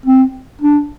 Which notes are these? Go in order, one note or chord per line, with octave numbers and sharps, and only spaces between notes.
C4
D4